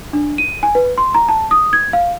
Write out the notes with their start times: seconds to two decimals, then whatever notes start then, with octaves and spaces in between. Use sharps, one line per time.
0.13 D4
0.38 D#7
0.63 G#5
0.75 B4
0.98 C6
1.14 A#5
1.29 A5
1.51 D#6
1.73 G#6
1.93 F5